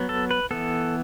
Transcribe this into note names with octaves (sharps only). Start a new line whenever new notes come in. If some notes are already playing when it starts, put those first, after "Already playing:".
Already playing: F#3 B3
A4
B4
E3 B3 A4